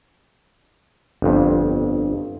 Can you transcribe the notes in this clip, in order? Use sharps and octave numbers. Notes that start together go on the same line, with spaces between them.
G1 F2